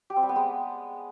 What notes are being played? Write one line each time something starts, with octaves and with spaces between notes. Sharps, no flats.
G4
C4
G3
B3
G#3